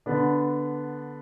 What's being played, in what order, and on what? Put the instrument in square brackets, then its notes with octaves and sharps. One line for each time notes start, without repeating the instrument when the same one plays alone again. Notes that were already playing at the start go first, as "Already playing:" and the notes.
[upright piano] D3 B3 D4